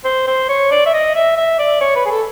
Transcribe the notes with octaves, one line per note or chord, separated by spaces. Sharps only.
C5
C5
C#5
D5
E5
D#5
E5
E5
D5
C#5
B4
G#4
A4